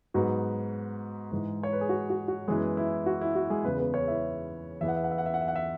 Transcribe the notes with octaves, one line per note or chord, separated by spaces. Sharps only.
G#2 F#3 B3 F#4
G#2 E3 G#3
C#5
B4
G#4
F#4
F#4
F#4
F#2 E3 G#3 B3 G#4
E4
F#4
E4
F#4
G#3 G#4
E2 C#3 E3 B3 B4
B3 B4
C#4 C#5
E4 E5
E2 E3 B3 E5
F#5
E5
F#5
E5
F#5
E5
F#5
E5
F#5
E5